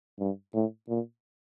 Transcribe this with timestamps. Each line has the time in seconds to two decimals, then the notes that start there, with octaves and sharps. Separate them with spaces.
0.19 G2
0.54 A2
0.89 A#2